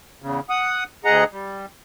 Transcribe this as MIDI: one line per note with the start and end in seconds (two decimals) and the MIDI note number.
0.22 0.40 40
0.22 0.40 49
0.49 0.84 78
0.49 0.84 87
1.05 1.24 38
1.05 1.24 68
1.05 1.24 75
1.05 1.24 78
1.05 1.24 82
1.31 1.66 55